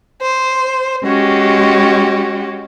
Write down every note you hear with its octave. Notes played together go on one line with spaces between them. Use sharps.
C5
G#3 C#4 F#4 G4